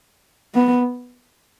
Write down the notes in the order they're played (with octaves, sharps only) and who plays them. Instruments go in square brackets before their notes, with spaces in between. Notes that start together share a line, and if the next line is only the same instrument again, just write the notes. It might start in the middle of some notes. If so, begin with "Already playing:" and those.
[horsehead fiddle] B3